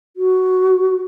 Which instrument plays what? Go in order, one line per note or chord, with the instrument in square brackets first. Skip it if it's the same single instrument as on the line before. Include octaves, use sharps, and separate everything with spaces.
[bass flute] F#4